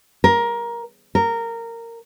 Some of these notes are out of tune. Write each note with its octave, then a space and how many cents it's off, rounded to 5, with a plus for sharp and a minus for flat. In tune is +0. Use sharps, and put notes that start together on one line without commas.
A#4 +15
A#4 -15